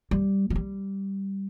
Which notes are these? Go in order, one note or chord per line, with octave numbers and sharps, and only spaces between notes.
G3
F#3
G3